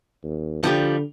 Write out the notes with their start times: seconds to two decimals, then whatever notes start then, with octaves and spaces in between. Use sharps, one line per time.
0.23 D#2
0.64 D3 F3 G3 G4